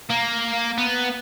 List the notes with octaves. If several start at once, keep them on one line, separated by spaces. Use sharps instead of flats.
A#3
B3